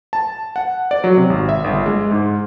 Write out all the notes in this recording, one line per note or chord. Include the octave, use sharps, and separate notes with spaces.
A5
F#5
D5
F#3
C3
G#1
E5
G1
G#3
G#2